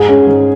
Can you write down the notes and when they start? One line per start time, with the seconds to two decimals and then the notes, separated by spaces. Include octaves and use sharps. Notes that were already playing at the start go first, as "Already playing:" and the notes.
Already playing: G#2 G#4
0.08 G#3 C#4
0.27 G#2